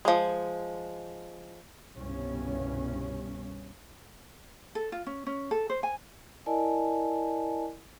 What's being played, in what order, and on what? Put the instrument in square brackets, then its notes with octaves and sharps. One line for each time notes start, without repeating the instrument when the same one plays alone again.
[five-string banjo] F3 G#3
[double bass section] G1 C2 G2 B2 C#4
[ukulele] A4
F4
C#4
C#4
A4
C5
G#5
[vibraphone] E4 A#4 D5 D#5 G#5 A5